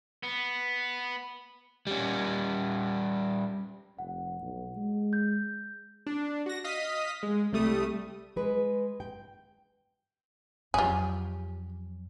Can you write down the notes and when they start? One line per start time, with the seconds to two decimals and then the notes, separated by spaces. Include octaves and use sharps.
0.23 B3
1.87 G3 C#4
3.99 F1 F#5
4.41 B1
4.77 G#3
5.13 G6
6.07 D4
6.46 F#4 A#6
6.64 D#5 F5 D#6 B6
7.23 G#3
7.52 C2 G3 A3 D#6
8.36 G#3 B4
9.00 G5
10.74 F2 F#3 C#4 F4 G4 G#4